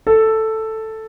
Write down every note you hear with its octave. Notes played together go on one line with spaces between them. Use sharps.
A4